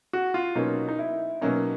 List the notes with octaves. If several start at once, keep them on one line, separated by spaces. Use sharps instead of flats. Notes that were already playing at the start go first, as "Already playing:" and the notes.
F#4
F4
B2 F#3 A#3 C#4 D#4
D#4
E4
B2 F#3 A#3 C#4 D#4